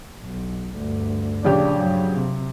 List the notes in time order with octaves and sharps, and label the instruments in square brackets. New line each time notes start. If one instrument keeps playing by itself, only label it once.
[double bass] B1
D2 G2
[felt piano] A#1 C#3 G4 [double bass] D4
[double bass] G2 F#3
C3